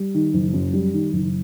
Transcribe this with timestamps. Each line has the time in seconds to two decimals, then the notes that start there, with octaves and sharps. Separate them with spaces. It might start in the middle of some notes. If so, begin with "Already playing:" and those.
Already playing: G3
0.14 D#3
0.34 F#1
0.53 F#2
0.73 G3
0.93 D#3
1.13 F#1